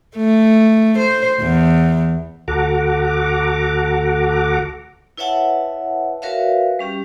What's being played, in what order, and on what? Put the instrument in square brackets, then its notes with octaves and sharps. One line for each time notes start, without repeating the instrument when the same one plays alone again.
[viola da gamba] A3
C5
E2
[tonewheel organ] D2 F#4 A4 F#5 A#5 D6
[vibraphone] E4 B4 C#5 E5 F#5 A5
F#4 A#4 B4 C#5 E5 F5
G3 C#4 G4